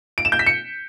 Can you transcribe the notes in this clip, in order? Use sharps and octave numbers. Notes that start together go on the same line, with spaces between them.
D7
E7
G6
B6
C#7